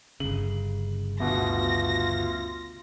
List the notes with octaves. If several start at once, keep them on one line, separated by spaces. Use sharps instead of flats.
G1 C#3 F#7
D2 B2 F4 A#6